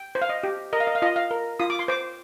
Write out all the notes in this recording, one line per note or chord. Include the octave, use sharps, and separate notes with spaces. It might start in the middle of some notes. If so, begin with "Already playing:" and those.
Already playing: G5
C5
F5
D#5
G4
A#4 D#5
F5
D#5
F5
F4 D#5
F5
A#4
F4 D#6
D6
C6
C5 D6